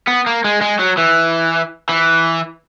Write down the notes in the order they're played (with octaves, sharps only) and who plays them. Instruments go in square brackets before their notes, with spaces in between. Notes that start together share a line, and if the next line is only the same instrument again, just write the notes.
[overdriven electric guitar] B3
A#3
G#3
G#3
F#3
E3
E3